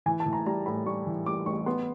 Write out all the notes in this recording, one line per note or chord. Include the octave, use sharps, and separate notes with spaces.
E3 G#5
A5
E3
A#5
G3 A#5
A2 B5
G3 C#6
E3
G3 D6
A1 C#6
B3 C6